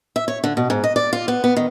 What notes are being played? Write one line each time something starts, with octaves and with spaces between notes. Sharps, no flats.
E5
C#5
D3
B2
G#2
D#5
D5
F4
B3
B3
D#3